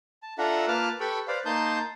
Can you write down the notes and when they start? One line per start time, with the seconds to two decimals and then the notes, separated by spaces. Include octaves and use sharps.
0.23 A5
0.38 D4 F4 A4 E5 F#5 A#5
0.68 A#3 F4 B4 A5 D6 F6
1.00 G4 A4 B4 G5 B5 C#6
1.28 B4 C5 D5 F5
1.45 A#3 D#4 A5 C6 D#6 G6